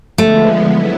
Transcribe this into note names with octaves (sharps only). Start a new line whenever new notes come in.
D3 F3 G#3 A3 B3
F#3 B3 E4